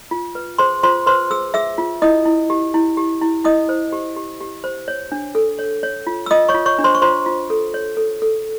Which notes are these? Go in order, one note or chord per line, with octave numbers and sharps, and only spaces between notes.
F4
B4
G#4 C5 C6
F4 C5 C6
B4 C5 C6
G#4 E6
G#4 E5 E6
F4
E4 D#5 D#6
E4
G4
E4
G4
E4
E4 D#5 D#6
C5
G4
G4
G4
C5
C#5
D4
A4
C#5
C#5
F4
E6
F4 D#5 D#6
C#5 C#6
F4
C#5 C#6
D4
C5 C6
C#6
F4 C5 C6
F4
A4
C#5
A4
A4